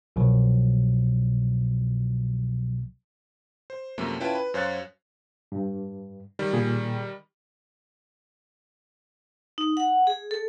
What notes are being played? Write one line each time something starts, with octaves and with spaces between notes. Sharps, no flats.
C2 B2 F3 F#3
C5
F#2 C3 F3 A3 A#3
C#4 E4 F4 B4 G5 A5
B4
F#2 C5 C#5 F5 F#6 A6
G2
D#3 G3
A#2 G#4
D#4
F#5
G#4
A4